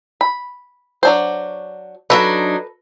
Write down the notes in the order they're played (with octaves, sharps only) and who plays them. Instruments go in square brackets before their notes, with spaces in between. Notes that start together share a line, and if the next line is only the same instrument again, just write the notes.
[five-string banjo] B5
F#3 D4 C5
[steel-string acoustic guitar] F#3 D4 D#4 [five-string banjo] A4 B4